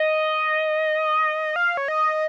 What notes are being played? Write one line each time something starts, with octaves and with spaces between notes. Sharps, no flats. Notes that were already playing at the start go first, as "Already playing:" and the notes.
Already playing: D#5
F5
C#5
D#5